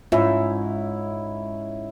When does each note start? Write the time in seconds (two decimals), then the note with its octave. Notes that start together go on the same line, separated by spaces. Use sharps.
0.12 G#2 C#4 E4 F4 E5